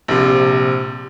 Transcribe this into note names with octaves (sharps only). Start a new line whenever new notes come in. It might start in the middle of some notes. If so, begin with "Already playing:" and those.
A#1 C3